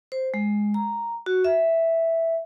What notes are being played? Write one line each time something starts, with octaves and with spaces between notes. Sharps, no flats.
C5
G#3
A#5
F#4
E5